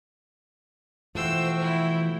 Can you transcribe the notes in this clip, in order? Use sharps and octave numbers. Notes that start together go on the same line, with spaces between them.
B2 E3 F3 A3 F#4 C5 G5 E6
E4